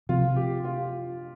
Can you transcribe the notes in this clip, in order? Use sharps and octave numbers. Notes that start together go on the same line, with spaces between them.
C3 F3 C4 F4
G4
F4